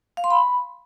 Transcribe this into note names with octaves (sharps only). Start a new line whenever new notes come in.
F5
C6
B5